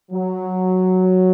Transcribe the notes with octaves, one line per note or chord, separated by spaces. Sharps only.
F#3